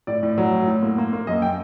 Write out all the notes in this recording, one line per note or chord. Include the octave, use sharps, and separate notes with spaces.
A2 D5
A2
F#3
A2
A2
A#3
A#3
A#3
F#2 D#5
G5